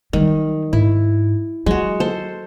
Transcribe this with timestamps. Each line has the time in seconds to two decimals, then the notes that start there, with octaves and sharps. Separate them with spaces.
0.13 D#3 F#3 G3
0.73 G#2 E4
1.66 F#3 G#3 F#4
2.00 A4 C5